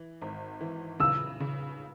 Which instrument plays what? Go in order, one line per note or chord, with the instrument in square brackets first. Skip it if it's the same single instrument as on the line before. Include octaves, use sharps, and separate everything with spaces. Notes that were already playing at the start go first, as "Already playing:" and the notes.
Already playing: [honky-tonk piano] E3
G#1
E3
[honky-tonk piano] C#3 [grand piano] E6
[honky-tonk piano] C#3